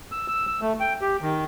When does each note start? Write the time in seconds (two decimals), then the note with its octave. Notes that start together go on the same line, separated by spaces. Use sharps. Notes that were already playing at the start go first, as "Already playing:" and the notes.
0.12 E6
0.28 E6
0.47 E6
0.61 A3
0.80 G5
1.02 G4
1.22 D#3